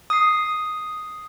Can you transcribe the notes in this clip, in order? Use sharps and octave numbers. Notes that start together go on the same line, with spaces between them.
D#6 C7